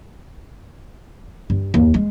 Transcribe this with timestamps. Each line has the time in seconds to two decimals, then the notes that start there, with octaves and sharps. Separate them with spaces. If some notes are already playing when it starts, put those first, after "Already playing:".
1.50 G2
1.74 D#2
1.94 G#3